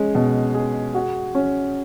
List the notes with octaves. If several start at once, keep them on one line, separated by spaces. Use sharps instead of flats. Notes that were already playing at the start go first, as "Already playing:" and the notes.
Already playing: G#3 C#4
B2
G#4
F#4
C#4